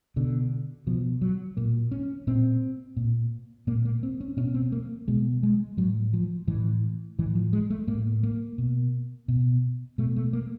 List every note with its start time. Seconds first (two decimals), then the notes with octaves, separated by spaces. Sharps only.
0.16 B2 D3
0.87 B2 F3
1.21 F#3
1.57 A#2 A#3
1.91 C#4
2.27 A#2 C4
2.97 A#2
3.67 A#2 A#3
3.85 A#3
4.03 C4
4.20 C#4
4.37 B2 C#4
4.54 C4
4.72 A#3
5.08 B2 G#3
5.43 G#3
5.77 A2 F#3
6.13 F3
6.47 A2 E3
7.19 A2 E3
7.35 F3
7.53 G#3
7.70 A3
7.87 A2 A#3
8.23 A#3
8.58 B2
9.28 B2
9.98 B2 A3
10.16 A3
10.33 A#3